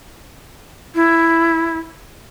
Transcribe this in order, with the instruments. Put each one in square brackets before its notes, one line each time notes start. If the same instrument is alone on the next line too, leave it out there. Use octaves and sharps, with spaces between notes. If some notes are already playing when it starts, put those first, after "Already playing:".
[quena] E4